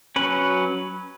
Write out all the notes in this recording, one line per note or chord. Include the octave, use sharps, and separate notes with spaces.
F#3 C#4 B4